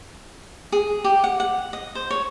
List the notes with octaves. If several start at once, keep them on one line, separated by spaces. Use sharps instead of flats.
G#4
G4
F#5
F#5
D#5
C5
C#5